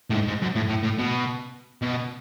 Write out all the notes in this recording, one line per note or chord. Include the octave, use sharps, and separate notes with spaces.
A2
G#2
G#2
F#2
A2
A2
A2
B2
B2